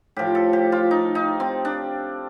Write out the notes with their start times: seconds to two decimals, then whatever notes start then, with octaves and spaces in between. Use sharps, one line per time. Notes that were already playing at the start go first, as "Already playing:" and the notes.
0.16 A2 F3 G4
0.35 A4
0.53 G4
0.72 F4
0.91 D#4
1.15 D#4
1.40 C4
1.65 D4